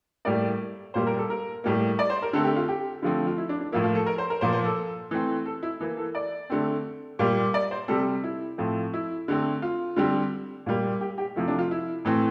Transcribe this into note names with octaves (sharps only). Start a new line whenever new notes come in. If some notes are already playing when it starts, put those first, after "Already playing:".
A2 G3 A#3 D5
A#2 G3 A#3 C5
A#4
A4
A#4
A2 G3 A#3
D5
C5
A#4
D3 A3 C4 A4
G4
F4
G4
D3 F3 A3 C4
F4
E4
D4
D4
A2 F3 A#3 E4
F4
A4
A#4
C5
A#4
A#2 F3 A#3 C5
C5
A4
E3 A3 C4
A4
E4
E3 A#3
A4
D5
D3 A3 C4
A#2 G3 A#3
D5
C5
C3 G3 C4 A4
E4
A2 F3 A3 C4
E4
D3 A3 C4
F4
D3 G3 C4
A#2 G3 A#3
G4
G4
C3 F3 A3 E4
D4
F4
E4
A2 E3 A3 C4